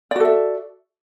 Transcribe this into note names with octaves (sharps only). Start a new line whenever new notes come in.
F#4 A4 D5 E5